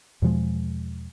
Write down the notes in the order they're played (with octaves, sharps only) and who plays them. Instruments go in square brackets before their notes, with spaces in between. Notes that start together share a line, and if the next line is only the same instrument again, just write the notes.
[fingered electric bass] E2 B2 F3 G#3